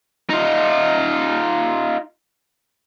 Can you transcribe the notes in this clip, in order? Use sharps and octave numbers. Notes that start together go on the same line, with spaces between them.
D#4 F4